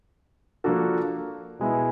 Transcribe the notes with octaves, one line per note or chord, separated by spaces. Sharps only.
F3 A#3 D4 F#4 A4
B2 G#3 B3 E4